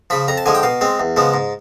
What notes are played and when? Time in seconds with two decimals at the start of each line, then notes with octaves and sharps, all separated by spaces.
0.10 C#3 F3 B5
0.28 F2 A#5
0.38 A5
0.46 D3 F3 G#3 G#5
0.55 G5
0.63 B2 F5
0.81 G#3 C4
1.00 E2
1.16 C#3 F3 G#3 B3
1.34 G#2